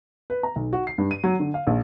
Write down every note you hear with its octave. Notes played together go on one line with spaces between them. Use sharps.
B4
A#5
B1
F#4
C7
G2
D#7
F#3
D3
F5
A#1